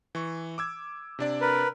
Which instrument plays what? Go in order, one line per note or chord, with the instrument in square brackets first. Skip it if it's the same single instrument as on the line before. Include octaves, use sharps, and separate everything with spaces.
[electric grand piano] E3 C#6
D6 E6 G#6
C3 D4 D5
[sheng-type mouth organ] A#4 B4